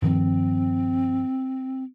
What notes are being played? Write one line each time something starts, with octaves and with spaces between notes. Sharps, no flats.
G2 D#3 F3 C4